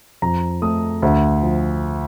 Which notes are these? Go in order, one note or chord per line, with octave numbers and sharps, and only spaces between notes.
F2 A#5
A3 D#6
D2
F3